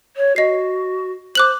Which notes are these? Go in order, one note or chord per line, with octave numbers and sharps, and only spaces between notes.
C#5
F#4 D#5 C7
C5 D6 F#6 F#7